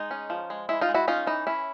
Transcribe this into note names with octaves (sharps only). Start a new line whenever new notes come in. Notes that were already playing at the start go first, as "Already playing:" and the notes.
Already playing: G#3 D#4
C#4
F3
G#3
G#3 E4
D#4 F4
G#3
E4 F#4
C#4 D#4 F4
E3 D#4
C#4 E4